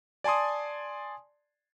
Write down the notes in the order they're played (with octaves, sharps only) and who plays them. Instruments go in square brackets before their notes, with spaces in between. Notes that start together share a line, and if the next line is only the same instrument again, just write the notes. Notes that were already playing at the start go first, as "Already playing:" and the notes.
[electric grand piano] D5 G#5 A5 C6 D#6